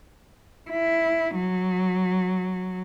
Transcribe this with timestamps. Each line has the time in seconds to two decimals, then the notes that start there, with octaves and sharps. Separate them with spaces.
0.71 E4
1.35 F#3